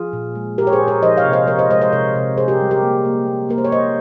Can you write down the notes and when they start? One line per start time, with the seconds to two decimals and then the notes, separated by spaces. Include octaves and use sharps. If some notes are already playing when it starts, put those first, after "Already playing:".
Already playing: F3 F4 G#4
0.13 A#2
0.35 G#3
0.58 A#2 G4 A#4
0.67 C#5
0.73 G#4 C5
0.81 A#2
0.88 A#4 C#5
1.02 F3 C5 D#5
1.17 C#5 F5
1.25 C3
1.33 C5 D#5
1.47 F3 A#4 C#5
1.59 C5 D#5
1.70 G#3 C5 D#5
1.81 C5 D#5
1.92 C3 A#4 C#5
2.15 C3
2.37 C3 G#4 C5
2.48 G4 A#4
2.60 G3
2.71 G4 A#4
2.83 A#3
3.05 A#3
3.27 A#3
3.49 A#3 A#4
3.58 C5
3.65 C#5
3.72 F3 C5 D#5